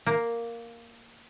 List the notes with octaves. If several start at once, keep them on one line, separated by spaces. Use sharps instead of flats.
A#3